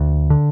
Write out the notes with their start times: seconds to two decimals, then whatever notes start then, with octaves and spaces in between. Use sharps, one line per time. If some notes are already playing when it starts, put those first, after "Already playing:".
Already playing: D2
0.30 D3